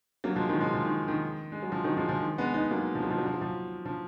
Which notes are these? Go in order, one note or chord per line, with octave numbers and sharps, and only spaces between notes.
F#3 A#3
F3 G#3
D#3 F#3
F3 G#3
F3
D#3
D#3
G#3
F#3
F3
D#3 F#3
F3 G#3
F3
D#3
G#3 B3
B3 D#4
F#3 A#3
F3
F#3
F3
F#3
F3
F#3
F3
F3